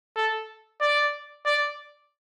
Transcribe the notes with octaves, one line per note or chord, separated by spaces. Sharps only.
A4
D5
D5